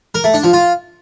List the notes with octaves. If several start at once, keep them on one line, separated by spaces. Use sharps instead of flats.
A#4
A3
D4
F3
F4